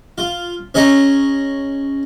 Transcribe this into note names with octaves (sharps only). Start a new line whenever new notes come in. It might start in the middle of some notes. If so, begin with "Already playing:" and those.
F4
C#4 G#4 D#5 A#5